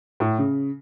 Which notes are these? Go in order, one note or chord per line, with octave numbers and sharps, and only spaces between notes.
A2
C#3